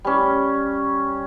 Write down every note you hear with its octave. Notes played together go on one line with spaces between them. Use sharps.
G3 C#4